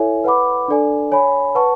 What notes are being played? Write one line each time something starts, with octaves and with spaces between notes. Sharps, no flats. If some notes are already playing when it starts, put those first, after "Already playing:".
Already playing: E4 A4 C#5 E5 G#5
B4 F#5 B5 D6
D4 A4 D5 G#5
C#5 G#5 B5
B4 F#5 A5 C#6